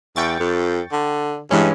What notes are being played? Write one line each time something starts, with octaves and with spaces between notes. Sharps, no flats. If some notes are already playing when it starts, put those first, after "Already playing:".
E2 G5 C#6 A6
F2
D3
G2 E3 G#3 C#4